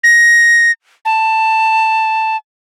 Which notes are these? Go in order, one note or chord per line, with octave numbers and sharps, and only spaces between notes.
A#6
A5